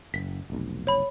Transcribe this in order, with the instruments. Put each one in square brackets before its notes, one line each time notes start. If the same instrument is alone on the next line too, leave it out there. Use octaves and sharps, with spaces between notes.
[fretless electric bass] F#1 [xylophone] B6
[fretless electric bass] F1 B1
[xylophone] C#5 B5